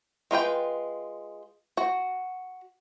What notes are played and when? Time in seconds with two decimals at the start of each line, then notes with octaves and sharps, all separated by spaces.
0.31 G#3 F4 B4 G5
1.77 F#4